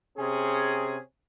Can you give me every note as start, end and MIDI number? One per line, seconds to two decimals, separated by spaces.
0.18 0.97 48
0.18 0.97 61
0.18 0.97 68